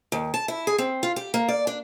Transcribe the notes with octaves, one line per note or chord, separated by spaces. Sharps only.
D#2
A5
E4
G#4
C4
F4
G4
A#3
D5
D4